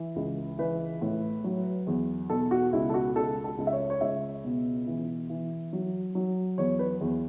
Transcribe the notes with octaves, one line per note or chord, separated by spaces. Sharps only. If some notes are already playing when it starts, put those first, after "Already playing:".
Already playing: E3
C#2
E3 B4
A2
F#3
E2
B2 A4
F#4
C#2 E4
A4
F#4
C#2 A4
A4
C#2
E5
C#5
C#5
C#2 E5
B2
E3
E3
F#3
F#3
E2 C#5
B4
E2